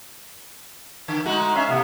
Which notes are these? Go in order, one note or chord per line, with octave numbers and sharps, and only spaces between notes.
D3
G#3 A3 D#4 F#4
C#4 E5 F5
A2 C3 A#3 B3